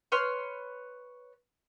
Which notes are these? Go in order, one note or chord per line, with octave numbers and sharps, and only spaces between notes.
B4 C#5 C6 F6